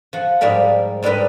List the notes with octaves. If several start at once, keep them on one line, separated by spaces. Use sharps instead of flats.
F3 F#5
G#2 F3 G3 A#4 B5
G#2 G3 D4 A#4 B4 D#5